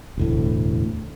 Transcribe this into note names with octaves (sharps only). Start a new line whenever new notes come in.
E1 D2 A2